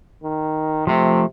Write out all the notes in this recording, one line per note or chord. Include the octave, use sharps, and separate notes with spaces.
D#3
C3 F3 A3